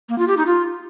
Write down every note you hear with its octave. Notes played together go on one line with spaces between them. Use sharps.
A#3
F4
G4
D#4
F4